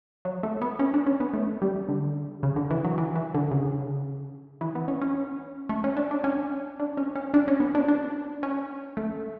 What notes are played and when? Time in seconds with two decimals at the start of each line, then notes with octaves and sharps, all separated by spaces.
0.25 F#3
0.43 A3
0.62 B3
0.79 C#4
0.94 D4
1.06 C#4
1.20 B3
1.33 A3
1.62 G3
1.89 D3
2.43 C#3
2.56 D3
2.71 E3
2.85 F#3
2.98 E3
3.16 E3
3.34 D3
3.51 C#3
4.61 E3
4.75 B3
4.88 C#4
5.01 C#4
5.69 A3
5.84 C#4
5.97 D4
6.11 D4
6.24 C#4
6.80 D4
6.97 C#4
7.15 C#4
7.34 D4
7.48 C#4
7.60 B3
7.75 D4
7.88 D4
8.43 C#4
8.97 A3